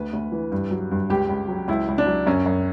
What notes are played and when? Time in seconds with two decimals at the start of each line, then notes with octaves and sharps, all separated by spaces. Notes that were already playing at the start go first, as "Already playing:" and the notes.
Already playing: D2 B4
0.13 D2
0.32 E3
0.52 G2
0.71 F#3
0.91 G2
1.10 C#2 G4
1.29 C#2
1.48 F#3
1.68 C#2 E4
1.88 C#2
1.98 D4
2.07 F#3
2.26 F#2 C#4
2.46 F#2